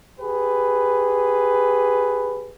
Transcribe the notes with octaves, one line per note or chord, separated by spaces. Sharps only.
G4 G#4 B4